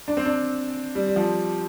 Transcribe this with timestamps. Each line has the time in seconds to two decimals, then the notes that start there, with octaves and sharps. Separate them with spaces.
0.08 D4
0.17 C4
0.25 D4
0.95 G3
1.08 G3
1.16 F3